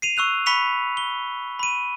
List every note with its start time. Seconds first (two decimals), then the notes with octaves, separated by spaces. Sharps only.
0.02 C7 D#7 F7
0.17 C#6 E6 F#6 F7
0.46 B5 C#6 B6 C#7 F7
0.97 G7
1.59 B5 D#7